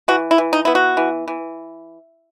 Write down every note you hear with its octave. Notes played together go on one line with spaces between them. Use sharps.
E3 F#4
E4
E3
D#4
B3 E4
F#4
E3
E3